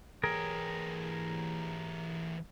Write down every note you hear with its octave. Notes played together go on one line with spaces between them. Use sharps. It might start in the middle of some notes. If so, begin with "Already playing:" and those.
E3 G4 G#4 A#4